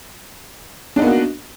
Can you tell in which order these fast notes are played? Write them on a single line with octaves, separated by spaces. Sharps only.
D4 D#4 B3 A#3 F#4